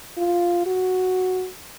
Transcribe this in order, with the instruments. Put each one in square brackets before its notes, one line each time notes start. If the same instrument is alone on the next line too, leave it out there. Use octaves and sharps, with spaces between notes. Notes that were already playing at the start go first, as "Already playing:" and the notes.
[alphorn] F4
F#4